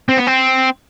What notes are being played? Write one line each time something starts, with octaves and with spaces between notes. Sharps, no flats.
C4
B3
C4